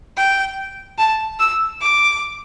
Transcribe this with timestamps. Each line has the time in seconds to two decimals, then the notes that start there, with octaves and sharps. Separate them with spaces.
0.17 G5
0.98 A5
1.39 E6
1.81 D6